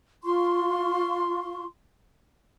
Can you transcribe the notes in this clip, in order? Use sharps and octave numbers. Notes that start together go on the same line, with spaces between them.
F4 C6 C#6